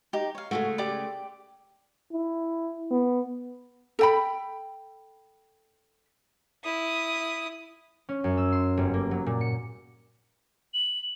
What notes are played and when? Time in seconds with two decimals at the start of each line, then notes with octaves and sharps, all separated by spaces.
0.13 D#4 G4
0.35 C#5 F5
0.51 C#3 G#3 A3 F#4
0.78 G4 D5 D6
2.12 E4
2.91 B3
3.99 A4 G5 B5
6.64 E4 D#6
8.09 C#4
8.24 F#2
8.38 E6
8.52 C6
8.77 G1
8.94 A#3
9.11 F#3
9.26 A#2
9.41 C#7
10.74 F#7